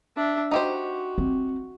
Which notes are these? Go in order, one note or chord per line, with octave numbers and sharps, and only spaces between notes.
D4 E5
D#4 F#4 G4 C5
C4